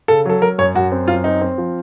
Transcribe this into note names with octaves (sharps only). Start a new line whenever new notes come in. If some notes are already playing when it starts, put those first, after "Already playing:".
C#3 A4
F#3 A4
F#3 A#4
F#2 C#5
F#2 F#4
C4
F#2 F4
C4 D#4
C4
F3